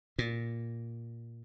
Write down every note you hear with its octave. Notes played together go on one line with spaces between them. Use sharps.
A#2